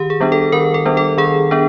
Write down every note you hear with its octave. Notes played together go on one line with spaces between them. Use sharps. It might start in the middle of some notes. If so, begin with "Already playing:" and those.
Already playing: D#3 G4
G#4
G3 B3 D4
A4
D#3 A#4
A4
G3 B3 D4
A4
D#3 G#4
B3 D4